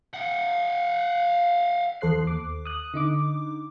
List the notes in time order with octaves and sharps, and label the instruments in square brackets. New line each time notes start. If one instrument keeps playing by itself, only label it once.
[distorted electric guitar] F5 F#5
[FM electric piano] E2 A4 C5 F#6 C7
D#2 D6
D#6 F#6
D3 D#4 D6